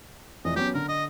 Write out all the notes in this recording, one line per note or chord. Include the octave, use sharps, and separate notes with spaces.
F1 E3 D#5
F#3 B3 C#4 G4
D3 A#4
D#5